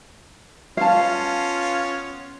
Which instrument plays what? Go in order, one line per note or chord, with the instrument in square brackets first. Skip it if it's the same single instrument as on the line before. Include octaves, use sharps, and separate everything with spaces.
[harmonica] B3 C#4 F4 [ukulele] F5 A5